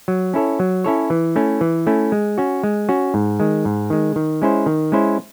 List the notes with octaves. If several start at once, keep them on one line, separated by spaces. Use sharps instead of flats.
F#3
C#4 E4 A4 C#5
F#3
C#4 E4 A4 C#5
E3
A3 C#4 E4
E3
A3 C#4 E4
G#3
C#4 F#4
G#3
C#4 F#4
G#2
D#3 G#3
G#2
D#3 G#3
D#3
G#3 C#4 E4 C5
D#3
G#3 C#4 E4 C5